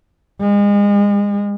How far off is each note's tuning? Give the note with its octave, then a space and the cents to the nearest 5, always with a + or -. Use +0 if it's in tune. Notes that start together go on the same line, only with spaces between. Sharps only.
G#3 -35